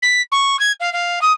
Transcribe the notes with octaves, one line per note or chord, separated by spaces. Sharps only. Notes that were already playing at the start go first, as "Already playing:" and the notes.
B6
C#6
G#6
F5
F5
D#6